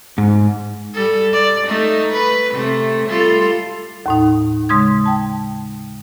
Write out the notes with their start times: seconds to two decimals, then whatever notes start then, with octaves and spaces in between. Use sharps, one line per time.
0.18 G#2
0.94 G3 A4
1.33 D5
1.67 A3 D#4
2.13 B4
2.52 C3 A3
3.09 G3 F4 A4
4.06 D#2 A2 D#4
4.69 C#3 G#3 C6 D#6 G#6
5.06 G5 A5